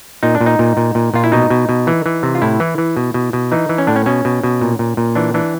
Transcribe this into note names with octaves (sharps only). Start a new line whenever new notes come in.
A#2 D#4
D4
A#2
D#4
A#2
A#2
A#2
A#2 F4
E4
B2 D#4
B2
B2
E3
E3
C3
F4
A2 E4
E3
E3
B2
B2
B2
E3 D#4
E3
C#4
A2 D4
C#4
B2 C#4
B2
B2
A#2
A#2
A#2
E3 D4
E3 D4